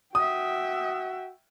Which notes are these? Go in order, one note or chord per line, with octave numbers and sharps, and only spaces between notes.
F#4 E5 G5 D#6